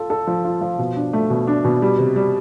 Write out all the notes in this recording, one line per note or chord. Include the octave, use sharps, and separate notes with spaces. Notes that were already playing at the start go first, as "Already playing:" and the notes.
Already playing: F4 A4
A4
F3
F4
F3
B2
D4
A3
B2
D4
B2
G3
C3
G3